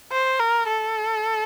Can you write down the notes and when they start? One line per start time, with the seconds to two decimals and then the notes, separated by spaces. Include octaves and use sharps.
0.12 C5
0.40 A#4
0.68 A4